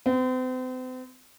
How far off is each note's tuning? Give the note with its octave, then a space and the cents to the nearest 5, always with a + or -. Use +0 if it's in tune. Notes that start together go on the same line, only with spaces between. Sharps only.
C4 -40